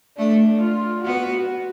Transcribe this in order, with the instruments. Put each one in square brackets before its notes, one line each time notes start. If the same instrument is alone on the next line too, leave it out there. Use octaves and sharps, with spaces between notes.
[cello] A3 [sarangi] D4
[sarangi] F4
[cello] B3 [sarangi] F#4